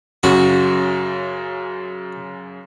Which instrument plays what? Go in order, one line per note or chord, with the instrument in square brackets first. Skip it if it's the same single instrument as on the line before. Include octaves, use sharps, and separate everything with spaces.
[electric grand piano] F#2 C#3 [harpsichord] F#4